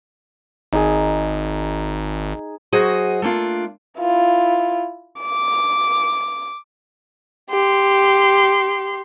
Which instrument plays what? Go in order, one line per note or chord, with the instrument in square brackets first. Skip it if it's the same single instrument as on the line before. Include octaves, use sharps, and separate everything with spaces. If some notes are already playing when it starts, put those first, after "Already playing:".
[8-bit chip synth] G#1 [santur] D#4 G#4
[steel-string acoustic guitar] F#3 F#4 G#4 C5 D#5
A3 A#3 D4 F4
[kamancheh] E4 F4
D6
G4 C6